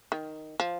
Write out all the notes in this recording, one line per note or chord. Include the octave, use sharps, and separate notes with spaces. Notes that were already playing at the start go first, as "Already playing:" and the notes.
D#3
F3